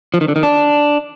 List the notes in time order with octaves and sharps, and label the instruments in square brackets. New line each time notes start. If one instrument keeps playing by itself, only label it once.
[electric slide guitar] F3
D#3
D3
D#3
D4